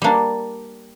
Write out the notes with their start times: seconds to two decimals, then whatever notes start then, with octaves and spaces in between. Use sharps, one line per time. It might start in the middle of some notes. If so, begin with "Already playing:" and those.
0.02 G3 A#3 D4